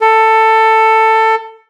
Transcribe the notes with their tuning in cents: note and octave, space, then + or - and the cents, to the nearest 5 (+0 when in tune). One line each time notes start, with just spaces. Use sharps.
A4 +15